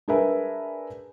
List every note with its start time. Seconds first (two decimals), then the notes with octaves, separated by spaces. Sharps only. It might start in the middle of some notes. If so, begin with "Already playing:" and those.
0.08 D4 G#4 A#4 B4 E5 G#5